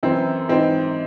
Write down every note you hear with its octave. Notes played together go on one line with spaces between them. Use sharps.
F#2 E3 C4
G#2 E3 C4